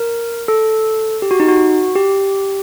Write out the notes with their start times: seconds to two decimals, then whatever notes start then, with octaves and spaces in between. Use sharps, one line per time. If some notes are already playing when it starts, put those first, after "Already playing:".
Already playing: A#4
0.48 A4
1.22 G4
1.31 F#4
1.40 D#4
1.48 F#4
1.95 G4